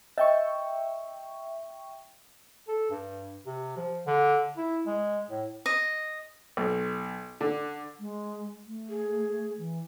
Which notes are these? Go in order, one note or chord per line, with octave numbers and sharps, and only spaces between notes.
D#5 E5 G5 C#6
A4
G2
C3
F3
D3
E4
G#3
A2
D#5
B1
D3
G#3
A3
G#4
E3